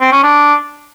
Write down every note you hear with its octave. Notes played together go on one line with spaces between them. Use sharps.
C4
C#4
D4